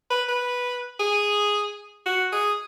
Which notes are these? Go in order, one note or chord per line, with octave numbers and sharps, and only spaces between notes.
B4
B4
G#4
F#4
G#4